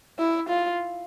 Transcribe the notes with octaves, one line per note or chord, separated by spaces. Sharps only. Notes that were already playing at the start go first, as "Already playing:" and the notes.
E4
F4